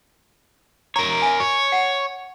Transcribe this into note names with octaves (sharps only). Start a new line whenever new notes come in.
A#4 C#5 A#5
E5 G#5
C#5
F#5